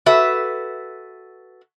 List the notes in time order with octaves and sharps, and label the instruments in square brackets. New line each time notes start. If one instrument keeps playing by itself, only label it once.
[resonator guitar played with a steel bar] F#4 A4 B4 E5